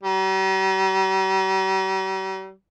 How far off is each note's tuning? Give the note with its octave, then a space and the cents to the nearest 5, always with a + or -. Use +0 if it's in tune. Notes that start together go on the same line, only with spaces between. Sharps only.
G3 -45